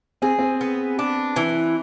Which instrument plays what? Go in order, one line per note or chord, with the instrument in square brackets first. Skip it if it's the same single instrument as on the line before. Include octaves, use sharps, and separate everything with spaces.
[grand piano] C4 [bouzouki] G#4
[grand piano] C4
[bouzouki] B3
D4
E3